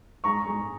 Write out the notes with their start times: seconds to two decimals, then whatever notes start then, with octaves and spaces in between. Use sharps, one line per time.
0.24 G#3 A#5 C#6
0.46 G#3